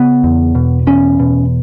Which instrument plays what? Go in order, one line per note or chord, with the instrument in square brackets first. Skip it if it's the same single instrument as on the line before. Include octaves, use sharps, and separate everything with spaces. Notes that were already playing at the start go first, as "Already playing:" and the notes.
Already playing: [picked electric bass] C#3 B3
E2
B2
E2 C#4
B2